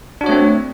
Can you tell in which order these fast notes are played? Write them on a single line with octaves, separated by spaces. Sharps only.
D4 F#4 C#5 A3 C4